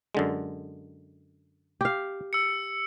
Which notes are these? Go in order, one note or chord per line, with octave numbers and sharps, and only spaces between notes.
F#2 D3 G#3
G4 F5
E6 C#7